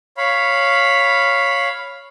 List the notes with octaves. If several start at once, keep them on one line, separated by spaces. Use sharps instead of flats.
C#5 F5 B5